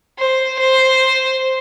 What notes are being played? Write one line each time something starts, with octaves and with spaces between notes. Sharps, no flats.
C5
C5